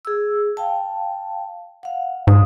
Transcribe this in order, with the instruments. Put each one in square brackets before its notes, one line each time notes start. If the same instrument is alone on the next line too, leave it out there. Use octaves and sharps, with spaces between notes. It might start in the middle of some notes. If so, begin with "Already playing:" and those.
[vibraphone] G#4 E6
F5 G5 A5
F5 F#5
[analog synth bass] G#2 [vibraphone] F5 D#6